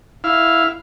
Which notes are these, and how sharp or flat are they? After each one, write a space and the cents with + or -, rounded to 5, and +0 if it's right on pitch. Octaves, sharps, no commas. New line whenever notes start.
E4 +0 F5 +0